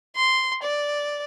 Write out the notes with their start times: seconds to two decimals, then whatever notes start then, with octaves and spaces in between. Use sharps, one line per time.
0.16 C6
0.63 D5